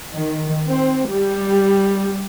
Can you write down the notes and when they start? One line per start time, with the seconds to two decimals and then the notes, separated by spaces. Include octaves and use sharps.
0.12 D#3
0.66 C4
1.09 G3